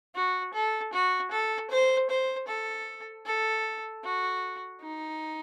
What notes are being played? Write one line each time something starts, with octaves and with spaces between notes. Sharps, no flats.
F#4
A4
F#4
A4
C5
C5
A4
A4
F#4
D#4